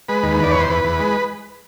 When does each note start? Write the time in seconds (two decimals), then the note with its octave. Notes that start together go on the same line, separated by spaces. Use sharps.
0.08 G#3 B4
0.23 D#2
0.39 E2 D5
0.51 E2 C#5
0.60 C5
0.70 E2 B4
0.84 E2
1.00 G#3